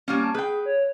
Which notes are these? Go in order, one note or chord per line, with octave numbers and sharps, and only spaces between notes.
G3 A#3 C#4
A5
G#4 B4 G5
C#5